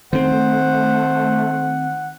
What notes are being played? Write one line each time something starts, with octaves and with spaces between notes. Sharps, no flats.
D#3 A3 C4 C5 F#5